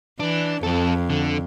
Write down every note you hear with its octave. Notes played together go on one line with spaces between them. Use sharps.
E3 D4
F2 C4 A4
D3